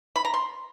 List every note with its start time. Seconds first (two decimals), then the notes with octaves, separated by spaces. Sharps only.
0.16 B5
0.25 A#5
0.34 C6